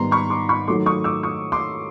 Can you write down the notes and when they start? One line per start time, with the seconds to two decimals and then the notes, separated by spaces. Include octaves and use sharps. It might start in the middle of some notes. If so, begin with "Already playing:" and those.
Already playing: G#2 D#3 G3 B3 A#5 C6
0.11 B5 C#6
0.30 C6 D6
0.49 B5 C#6
0.68 D#3 F#3 A3 C6 D6
0.86 C#6 D#6
1.04 D6 E6
1.23 C#6 D#6
1.52 C6 D6